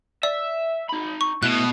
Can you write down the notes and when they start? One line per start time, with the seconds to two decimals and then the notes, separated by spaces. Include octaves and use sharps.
0.23 D5 E5
0.89 D#4 B5
1.21 C#6
1.43 B2 A3 E4 F#6